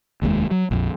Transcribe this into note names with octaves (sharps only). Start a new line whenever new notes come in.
F1 D#2 C3 G#3
F#3
A#1 F2